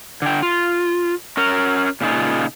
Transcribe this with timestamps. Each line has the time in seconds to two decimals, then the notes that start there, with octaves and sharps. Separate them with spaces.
0.22 D3 G5
0.42 F4
1.37 C#4 A#4
2.01 A#2 C#3 D#4 F4